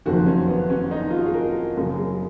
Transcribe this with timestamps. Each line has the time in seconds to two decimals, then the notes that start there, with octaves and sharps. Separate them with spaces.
0.06 F#1 F2 D#3 F#4
0.26 C#4
0.48 B3
0.70 C#4
0.91 D#4
1.10 F4
1.17 F#4
1.25 G#4
1.34 A#4
1.76 F#1 F#2 C#3 A#4
1.97 G#4